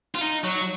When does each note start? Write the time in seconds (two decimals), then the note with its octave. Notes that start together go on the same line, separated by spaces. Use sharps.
0.15 F4
0.21 D#4
0.44 F#3